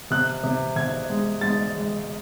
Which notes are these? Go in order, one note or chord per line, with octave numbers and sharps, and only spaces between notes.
C3 F#6
C3
C3 G#6
G#3
G#3 A6
G#3